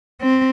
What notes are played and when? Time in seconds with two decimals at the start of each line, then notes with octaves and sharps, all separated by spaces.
0.21 C4